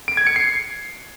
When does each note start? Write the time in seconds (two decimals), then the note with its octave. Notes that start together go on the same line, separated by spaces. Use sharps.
0.08 D7
0.17 G#6
0.27 C#7
0.36 C7